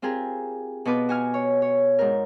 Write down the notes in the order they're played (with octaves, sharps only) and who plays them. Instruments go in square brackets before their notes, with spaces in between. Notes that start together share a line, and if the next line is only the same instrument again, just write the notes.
[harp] C4 F4 G4 G#4 A#4
B2 B3 F4 B4 D6
F#4 G#5 F6
C#5
C#5
G#2 A#4